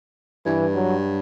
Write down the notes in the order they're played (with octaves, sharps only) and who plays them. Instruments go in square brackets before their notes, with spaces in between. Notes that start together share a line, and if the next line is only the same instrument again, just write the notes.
[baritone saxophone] G2 [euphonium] E3
[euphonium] F#3